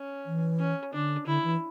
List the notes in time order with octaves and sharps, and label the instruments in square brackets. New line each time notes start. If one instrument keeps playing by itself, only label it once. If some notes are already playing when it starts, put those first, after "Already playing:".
Already playing: [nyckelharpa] C#4
[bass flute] E3
[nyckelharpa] C#4
[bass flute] D3 [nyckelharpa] D4
[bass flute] D3 [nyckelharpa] E4
[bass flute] E3